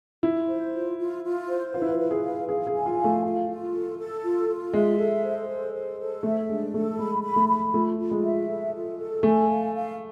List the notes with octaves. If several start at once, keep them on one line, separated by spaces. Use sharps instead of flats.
E4 F4
C5
F4
F4
F4
C5
F4 B4
E4
F4
B4
G#4
F5
G#4 F5
G#4
G#5
F4
F5
A3
F4
F4
A4
A4
F4
F4
G#3 E5
A4
C5
A4
C5
A4
A3 E5
G#3 D4
A3 A4
G#3 B5
B5
A3
B5
A3 F4
F4
G#3
E5
A4
F4
A4
A3 G#5
F5
F5